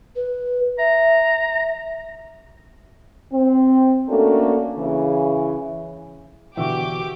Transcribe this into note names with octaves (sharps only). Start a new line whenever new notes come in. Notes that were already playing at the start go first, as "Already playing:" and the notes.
B4
E5 A#5
C4
A3 A#3 C#4 D4 F#4 A4
C#3 E3
B2 D3 E3 F#4 G4 E5 D6